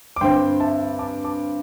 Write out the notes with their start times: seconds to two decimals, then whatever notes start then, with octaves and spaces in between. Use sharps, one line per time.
0.16 D6
0.21 G2 D3 C4 G5 C6
0.60 E5 A5
0.99 A5 D6
1.24 A5 D6